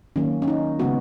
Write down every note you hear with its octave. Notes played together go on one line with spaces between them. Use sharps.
D#3 F#3 A#3 C#4
C#4
D#4
C#3 G#3 B3 F#4